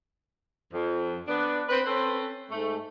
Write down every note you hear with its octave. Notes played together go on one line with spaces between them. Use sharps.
F2
B3 D4
C4 B4
C4 C#4 A4 B4 C5
G#2 A3